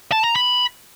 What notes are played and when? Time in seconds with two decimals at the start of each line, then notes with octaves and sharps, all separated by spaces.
0.12 A5
0.24 A#5
0.36 B5